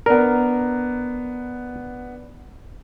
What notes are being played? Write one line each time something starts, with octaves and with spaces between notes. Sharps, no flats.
B3 D4 A#4